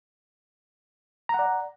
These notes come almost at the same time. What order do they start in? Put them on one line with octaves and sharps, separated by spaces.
A#5 F#5 D5